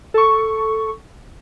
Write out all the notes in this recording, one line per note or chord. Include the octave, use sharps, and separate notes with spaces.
A4 C#6